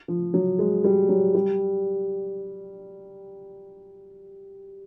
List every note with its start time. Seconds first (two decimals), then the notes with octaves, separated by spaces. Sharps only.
0.08 F3
0.34 F#3
0.59 G#3
0.84 G3
1.09 F#3
1.34 G3